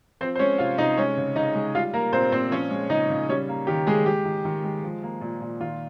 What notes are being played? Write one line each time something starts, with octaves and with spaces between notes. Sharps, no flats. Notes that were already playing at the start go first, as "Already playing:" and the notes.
F3 C4 C5
C5
G#3 C#4 C#5
C3 F4 F5
C3 D#4 D#5
G#3 C#4 C#5
C#3
C#3 D#4 D#5
G#3
G3 F4 F5
A#3 A#4
A#2 C4 C5
A#2 C4 C5
F3 C#4 C#5
G#3
C#3 D#4 D#5
C#3
G3 C#4 C#5
A#3
D#3 G4
D#3 G#3 G#4
G#3 G4
D#3
D#3
G#3
F3
A#3
A#2
A#2
D#3 F4